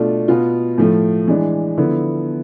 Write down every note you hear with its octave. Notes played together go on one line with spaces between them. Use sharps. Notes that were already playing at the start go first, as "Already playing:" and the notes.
Already playing: B2 A3 D4 F4
B2 B3 F4
A2 F3 A3
E3 G#3 D4
D3 F3 B3 E4